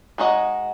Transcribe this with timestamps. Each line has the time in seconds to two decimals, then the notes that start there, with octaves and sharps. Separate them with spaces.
0.18 G#3 D#4 F#4 D#5